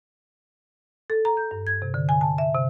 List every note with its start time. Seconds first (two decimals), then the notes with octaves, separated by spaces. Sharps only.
1.10 A4
1.25 A#5
1.37 G6
1.51 G2
1.67 G#6
1.82 C3
1.94 D3
2.09 G#5
2.21 A5
2.38 E5
2.55 C3